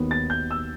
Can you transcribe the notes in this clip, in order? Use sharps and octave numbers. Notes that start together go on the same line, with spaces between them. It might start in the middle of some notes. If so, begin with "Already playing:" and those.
Already playing: D#2 D#3 F#3 B3
A6
G6
E6